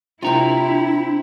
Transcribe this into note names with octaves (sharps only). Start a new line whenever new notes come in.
C3 D4 E4 F4 G5 A#5